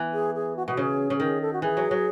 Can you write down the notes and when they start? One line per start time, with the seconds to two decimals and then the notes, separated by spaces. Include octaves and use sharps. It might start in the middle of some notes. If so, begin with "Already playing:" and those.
Already playing: E3 B3
0.13 G#4
0.35 G#4
0.56 F#4
0.67 B2 F#4
0.77 C#3 G#4
1.10 C#3
1.20 D#3 G#4
1.41 A4
1.53 F#4
1.62 E3 G#4
1.77 F#3
1.91 F#3